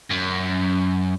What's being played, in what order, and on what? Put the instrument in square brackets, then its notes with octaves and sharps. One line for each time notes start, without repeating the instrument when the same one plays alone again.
[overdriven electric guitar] F#2